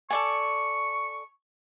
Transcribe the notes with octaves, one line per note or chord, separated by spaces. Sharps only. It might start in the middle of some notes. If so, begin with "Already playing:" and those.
A4 D5 G#5 C#6